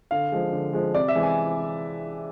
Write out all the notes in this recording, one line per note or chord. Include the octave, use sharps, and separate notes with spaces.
D3 F5
F3 G#3
D3
F3 G#3
C3 D5
E5
E3 G#3
G#5